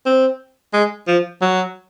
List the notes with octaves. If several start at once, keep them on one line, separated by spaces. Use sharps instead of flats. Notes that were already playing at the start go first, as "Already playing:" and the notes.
C4
G#3
F3
F#3